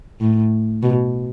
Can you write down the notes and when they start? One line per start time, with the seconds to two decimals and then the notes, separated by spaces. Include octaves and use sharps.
0.20 A2
0.82 B2